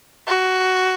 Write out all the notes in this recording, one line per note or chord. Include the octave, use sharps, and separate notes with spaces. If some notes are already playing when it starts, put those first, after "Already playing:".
F#4